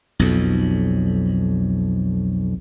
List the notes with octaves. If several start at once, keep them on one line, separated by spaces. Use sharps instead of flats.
B1 F2